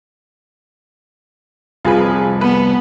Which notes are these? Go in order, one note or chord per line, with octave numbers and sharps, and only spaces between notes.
C2 F2 F4 G#4 B4
B3 B4